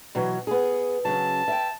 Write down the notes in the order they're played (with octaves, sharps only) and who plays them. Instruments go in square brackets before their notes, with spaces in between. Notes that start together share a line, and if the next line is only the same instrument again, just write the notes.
[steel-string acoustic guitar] B2 E3 F#3
B3 G#4
[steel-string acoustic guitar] C#3 F#3 [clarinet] A5
[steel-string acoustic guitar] E5 G5